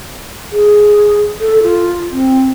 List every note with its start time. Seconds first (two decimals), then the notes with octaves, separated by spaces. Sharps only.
0.52 G#4
1.41 A4
1.63 F4
2.11 C4